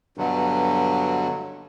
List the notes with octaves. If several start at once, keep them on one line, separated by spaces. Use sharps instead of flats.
G2 B2 D3 F#3